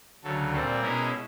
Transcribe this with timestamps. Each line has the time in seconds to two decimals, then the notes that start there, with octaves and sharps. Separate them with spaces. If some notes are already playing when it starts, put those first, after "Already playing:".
0.24 D2 C#3 F#3 A4
0.52 A#2 G3 C4 A4
0.81 B2 G#3 C#4 E4 A#4